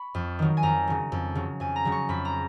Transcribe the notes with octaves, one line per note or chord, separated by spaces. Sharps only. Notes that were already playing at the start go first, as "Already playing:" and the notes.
Already playing: B5 C#6
F2
D#3 F#3
G#5
F2 A#5
C#3 F#3
F2
C#3 F#3
F2 G#5
A#5
C#3 F#3
C#6
F2 B5
A#5